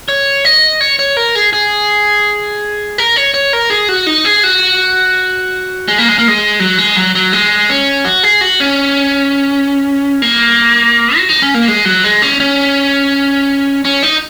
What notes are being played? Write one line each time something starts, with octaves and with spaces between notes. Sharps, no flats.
C#5
D#5
C#5
C#5
A#4
G#4
G#4
A#4
C#5
C#5
A#4
G#4
F#4
D#4
G#4
F#4
G#3
A#3
G#3
A#3
G#3
F#3
G#3
F#3
F#3
G#3
C#4
F#4
G#4
F#4
C#4
A#3
F#4
D#4
C#4
A#3
G#3
F#3
G#3
C#4
C#4
C#4
D#4